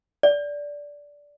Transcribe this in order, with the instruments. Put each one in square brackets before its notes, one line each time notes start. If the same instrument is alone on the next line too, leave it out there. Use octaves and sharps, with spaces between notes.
[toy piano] D5